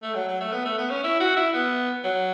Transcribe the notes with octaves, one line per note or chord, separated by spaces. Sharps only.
A3
F#3
F#3
A3
B3
A3
B3
C#4
E4
F#4
E4
B3
F#3